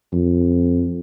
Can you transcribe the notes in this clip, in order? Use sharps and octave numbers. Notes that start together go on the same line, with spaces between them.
F2